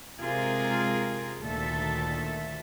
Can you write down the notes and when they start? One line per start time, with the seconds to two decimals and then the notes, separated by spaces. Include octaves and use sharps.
0.21 C3 G#3 F4 G#4 A#4
1.40 D2 A#2 D#3 A4 E5